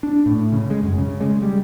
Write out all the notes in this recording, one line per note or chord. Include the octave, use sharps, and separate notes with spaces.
D4
A2
C#3
G#3
F#2
C#3
G#3
G3